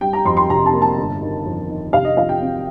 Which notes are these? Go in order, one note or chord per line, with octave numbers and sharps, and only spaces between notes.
G3 G5
A#5
F2 C6
C6
C3 A#5
A5
A#3
A5
G1
D#3
F2
D#3
C3 F5
D#5
F3 F5
G5
C4